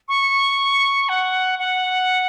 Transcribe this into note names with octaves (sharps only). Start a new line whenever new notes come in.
C#6
F#5
F#5